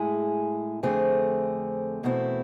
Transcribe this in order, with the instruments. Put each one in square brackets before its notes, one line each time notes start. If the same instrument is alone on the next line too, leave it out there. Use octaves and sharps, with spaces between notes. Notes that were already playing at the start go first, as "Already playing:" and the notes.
Already playing: [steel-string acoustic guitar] A2 G#3 E4 G#4
F2 D3 A3 C4 G#4
E2 B2 A3 C4 E4